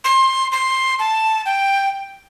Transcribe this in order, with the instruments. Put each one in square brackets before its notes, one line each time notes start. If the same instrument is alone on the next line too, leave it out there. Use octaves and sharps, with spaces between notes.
[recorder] C6
C6
A5
G5